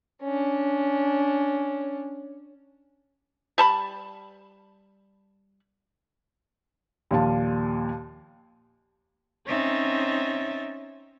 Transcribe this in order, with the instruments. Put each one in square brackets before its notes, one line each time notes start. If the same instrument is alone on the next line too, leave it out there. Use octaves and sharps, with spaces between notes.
[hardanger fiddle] C#4 D4
[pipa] G3 A5 B5
[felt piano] D#2 A#2 F3 F5 A5
[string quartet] C4 C#4 D#4 C#5 E5 A6